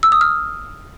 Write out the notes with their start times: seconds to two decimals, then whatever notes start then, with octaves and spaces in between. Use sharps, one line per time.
0.03 E6
0.12 D#6
0.21 F6